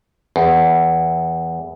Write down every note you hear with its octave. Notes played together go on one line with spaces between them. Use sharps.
E2